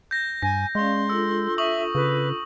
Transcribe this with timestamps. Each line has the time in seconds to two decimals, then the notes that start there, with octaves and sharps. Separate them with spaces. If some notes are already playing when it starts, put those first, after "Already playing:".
0.11 G6 A#6
0.43 G2 G#5 A#6
0.75 G#3 C#4 D5 F5 C6
1.09 D4 F4 A4 E6
1.58 E5 C#6 D#6 F#7
1.95 C#3 B4